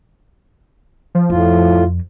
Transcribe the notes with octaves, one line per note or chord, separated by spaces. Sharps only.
F3
F2 A2 F4